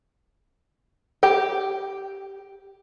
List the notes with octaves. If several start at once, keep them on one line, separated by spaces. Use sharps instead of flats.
G4 G5